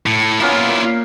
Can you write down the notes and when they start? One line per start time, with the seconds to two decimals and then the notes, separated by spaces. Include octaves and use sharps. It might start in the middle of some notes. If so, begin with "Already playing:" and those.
0.06 A2
0.40 A#3 B3 C#4 E4 F4
0.69 A#2